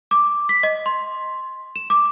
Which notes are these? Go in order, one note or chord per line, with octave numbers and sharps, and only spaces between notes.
D6
B6
D#5
C6
E7
D6